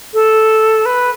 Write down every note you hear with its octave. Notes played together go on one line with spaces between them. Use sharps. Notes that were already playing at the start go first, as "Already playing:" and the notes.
A4
B4